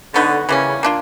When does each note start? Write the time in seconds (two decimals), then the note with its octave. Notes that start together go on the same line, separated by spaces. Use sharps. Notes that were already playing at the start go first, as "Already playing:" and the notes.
0.14 D3 F#3 B3 D#4 F#4
0.48 C#3 E3 G3 A#3 C#4
0.83 A#3 D4 F4